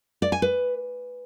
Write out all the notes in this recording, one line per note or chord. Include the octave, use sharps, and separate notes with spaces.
D5
G#5
B4